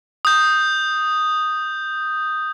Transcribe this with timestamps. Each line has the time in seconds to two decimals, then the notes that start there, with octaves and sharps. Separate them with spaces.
0.25 D#6 G6